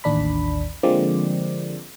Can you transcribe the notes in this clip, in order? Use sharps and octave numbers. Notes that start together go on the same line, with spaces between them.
A1 D#2 D4 B5
D3 F3 G#3 A#3 C4 D5